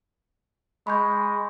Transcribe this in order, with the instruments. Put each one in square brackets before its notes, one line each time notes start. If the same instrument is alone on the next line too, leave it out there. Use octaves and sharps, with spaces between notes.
[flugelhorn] G#3 [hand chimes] B5 C#6 G6